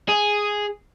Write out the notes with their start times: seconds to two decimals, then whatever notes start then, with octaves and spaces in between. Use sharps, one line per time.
0.09 G#4